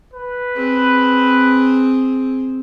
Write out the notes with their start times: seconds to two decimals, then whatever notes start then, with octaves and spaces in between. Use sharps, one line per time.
0.14 B4
0.56 C4 G#4